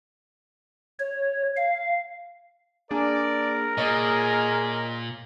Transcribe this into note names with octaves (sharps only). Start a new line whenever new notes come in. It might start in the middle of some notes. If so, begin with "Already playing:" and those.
C#5
F5
A#3 D4 G#4 A#4 D5
A#2 G#4 C#5 D#5